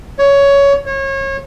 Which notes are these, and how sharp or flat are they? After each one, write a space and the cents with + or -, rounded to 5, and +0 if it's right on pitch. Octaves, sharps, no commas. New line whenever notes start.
C#5 +15
C#5 -30